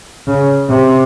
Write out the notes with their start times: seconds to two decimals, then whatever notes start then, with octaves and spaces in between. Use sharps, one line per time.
0.27 C#3
0.69 C3